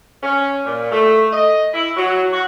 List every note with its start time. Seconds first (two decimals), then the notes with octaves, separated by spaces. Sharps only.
0.22 C#4
0.65 A#2
0.91 A3
1.33 D#5
1.73 E4
1.96 F#3
2.32 F#4